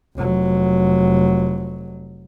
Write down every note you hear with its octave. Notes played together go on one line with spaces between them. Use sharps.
F1 F#3